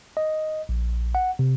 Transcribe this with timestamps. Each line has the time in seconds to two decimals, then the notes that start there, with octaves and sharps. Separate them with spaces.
0.17 D#5
0.69 A#1
1.15 F#5
1.39 C3